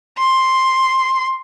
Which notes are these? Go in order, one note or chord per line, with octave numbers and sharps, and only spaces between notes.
C6